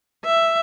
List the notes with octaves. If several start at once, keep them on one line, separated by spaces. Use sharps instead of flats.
E5